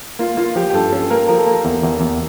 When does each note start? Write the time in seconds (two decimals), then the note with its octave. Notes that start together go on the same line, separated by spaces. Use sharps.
0.19 A#3 F4
0.37 A#3 F4
0.56 F3 G4
0.70 G4
0.74 G2 A4
0.92 C#4 A4
1.10 A#3 A#4
1.28 F3 A#4
1.37 A4
1.46 A#3 A#4
1.65 E2
1.83 E2
2.01 E2